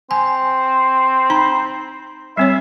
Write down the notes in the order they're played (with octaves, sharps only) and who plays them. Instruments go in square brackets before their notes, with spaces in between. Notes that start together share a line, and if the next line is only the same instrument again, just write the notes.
[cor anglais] C4 [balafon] G#5
[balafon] D#4 A#5
[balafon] G3 C4 C#5 [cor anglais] E5